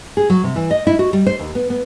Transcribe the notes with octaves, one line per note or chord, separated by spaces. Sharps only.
G#4
F#3
C3
E3
D#5
E4
F#4
G3
C5
D#2
B3
B3